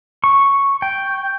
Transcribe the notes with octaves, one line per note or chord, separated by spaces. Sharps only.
C#6
G5